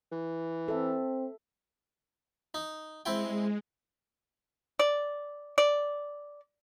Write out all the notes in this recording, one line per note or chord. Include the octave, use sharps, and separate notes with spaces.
E3
C4 A4 E5
D#4
G#3 C4 E4 G5
D5
D5